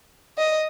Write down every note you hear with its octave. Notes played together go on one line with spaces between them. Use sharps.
D#5